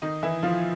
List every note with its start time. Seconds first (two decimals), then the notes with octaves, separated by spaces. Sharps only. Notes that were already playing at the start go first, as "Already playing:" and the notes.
0.02 D#3 D#4
0.23 E3 E4
0.43 F3 F4